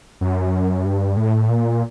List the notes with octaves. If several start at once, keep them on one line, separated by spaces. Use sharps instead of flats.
F#2
G2
A2
A#2